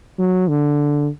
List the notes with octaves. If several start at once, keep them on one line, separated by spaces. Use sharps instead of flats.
F#3
D3